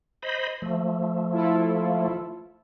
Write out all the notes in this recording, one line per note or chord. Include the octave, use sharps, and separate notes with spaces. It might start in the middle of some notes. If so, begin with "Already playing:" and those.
C5 D#5 B5
F3 A3
E4 F4 A4